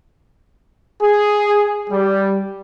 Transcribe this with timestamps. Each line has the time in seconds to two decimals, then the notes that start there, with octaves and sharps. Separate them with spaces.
1.01 G#4
1.90 G3